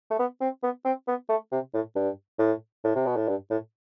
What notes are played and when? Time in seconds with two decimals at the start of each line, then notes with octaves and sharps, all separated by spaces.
0.11 A3
0.19 B3
0.41 C4
0.63 B3
0.85 C4
1.08 B3
1.29 A3
1.52 C3
1.74 A2
1.96 G2
2.39 A2
2.84 A2
2.96 C3
3.06 B2
3.17 A2
3.28 G2
3.50 A2